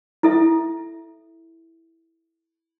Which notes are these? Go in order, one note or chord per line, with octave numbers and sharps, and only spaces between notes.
E4 A4 E5